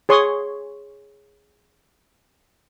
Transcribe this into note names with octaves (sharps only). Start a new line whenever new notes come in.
G#4 C#5 C6 C#6 D#6